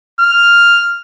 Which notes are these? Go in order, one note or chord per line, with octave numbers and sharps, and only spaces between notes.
F6